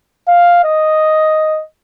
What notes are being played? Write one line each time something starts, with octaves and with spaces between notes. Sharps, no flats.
F5
D#5